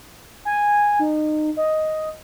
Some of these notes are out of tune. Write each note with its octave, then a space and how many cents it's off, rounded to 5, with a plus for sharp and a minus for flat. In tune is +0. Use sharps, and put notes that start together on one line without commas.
G#5 -10
D#4 -25
D#5 +5